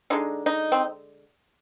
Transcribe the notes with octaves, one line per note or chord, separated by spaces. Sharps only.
D3 G#3 D#4
D#4
C4